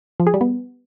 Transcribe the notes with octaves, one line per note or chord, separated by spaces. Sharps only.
F3
G#4
G3
B3